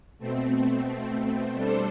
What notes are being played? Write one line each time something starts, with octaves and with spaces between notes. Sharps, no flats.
B2 A3 C4
G3 D4 A4 C5